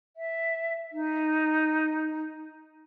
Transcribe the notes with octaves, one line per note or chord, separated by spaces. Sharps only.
E5
D#4